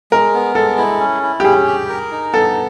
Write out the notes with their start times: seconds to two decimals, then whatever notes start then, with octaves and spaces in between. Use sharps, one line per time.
0.12 G#3 A#4
0.34 B3
0.55 G#3 A4
0.78 E4
1.00 C#4
1.23 E4
1.40 G4
1.44 C#4 G#4
1.67 G4
1.89 A#4
2.11 D#4
2.33 B3 A4